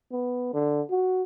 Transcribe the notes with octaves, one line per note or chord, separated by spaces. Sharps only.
B3
D3
F#4